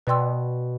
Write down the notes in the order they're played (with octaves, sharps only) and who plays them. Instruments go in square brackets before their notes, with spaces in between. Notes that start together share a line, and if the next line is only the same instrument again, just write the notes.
[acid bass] B2 [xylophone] B4 D5 G5 C6 E6